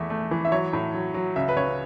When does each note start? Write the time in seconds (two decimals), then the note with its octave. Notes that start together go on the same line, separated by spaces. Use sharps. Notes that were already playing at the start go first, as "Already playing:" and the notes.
Already playing: E2 A3 E5
0.10 A3
0.31 E3
0.45 E5
0.52 F#3 C#5
0.73 A2
0.94 F#3
1.14 F#3
1.36 C#2 E5
1.49 B4
1.56 C#2 C#5